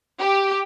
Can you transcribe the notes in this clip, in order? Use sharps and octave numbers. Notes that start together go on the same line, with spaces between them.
G4